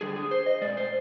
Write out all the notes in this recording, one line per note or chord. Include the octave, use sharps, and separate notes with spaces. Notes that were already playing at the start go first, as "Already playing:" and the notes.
D3 G3 G#4
G#4
C5
D#5
A#2 G#3 D5
C5